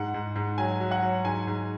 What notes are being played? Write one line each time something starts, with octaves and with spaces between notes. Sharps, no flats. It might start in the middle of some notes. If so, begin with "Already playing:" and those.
Already playing: G#2 F#5
G#2
G#2
F#3 G#5
F#3
F#5
F#3
G#2 G#5
G#2